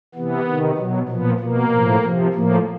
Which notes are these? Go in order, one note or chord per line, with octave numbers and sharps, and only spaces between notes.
C3 E3 B3
C3 D#3
B2 F#3
A#2 F3 B3
B2 A#3
A2 F3
C3 F3
A2 F3 A#3